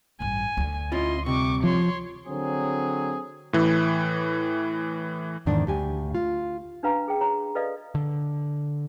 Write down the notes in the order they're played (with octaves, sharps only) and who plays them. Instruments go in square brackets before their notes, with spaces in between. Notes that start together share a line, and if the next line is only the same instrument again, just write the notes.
[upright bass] A1 G2 [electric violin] G#5
[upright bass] D2 D3
[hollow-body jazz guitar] C#4 E4 F4 [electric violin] D#5 C6
[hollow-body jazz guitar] C2 C3 [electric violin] C#6 D6
[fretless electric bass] F3 [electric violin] C#5 C6
[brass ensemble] D3 F#3 C4 G#4
[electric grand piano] A2 E3
[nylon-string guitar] E2 G#2 D#3 D4
D2 G4 G#5
F4
[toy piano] C#4 D4 F#4 B4 F5 A#5
G#4 G5
F#4 C#5 A#5
F#4 A4 B4 D5 D#5 F5
[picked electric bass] D3